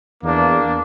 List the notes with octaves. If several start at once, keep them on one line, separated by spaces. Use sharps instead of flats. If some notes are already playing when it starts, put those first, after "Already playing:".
E2 A#3 D4